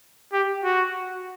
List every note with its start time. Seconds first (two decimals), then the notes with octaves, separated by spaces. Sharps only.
0.33 G4
0.64 F#4